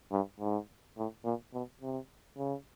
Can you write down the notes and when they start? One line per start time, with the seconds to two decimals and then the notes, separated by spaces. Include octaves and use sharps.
0.12 G2
0.40 G#2
0.97 A2
1.25 A#2
1.54 B2
1.81 C3
2.37 C#3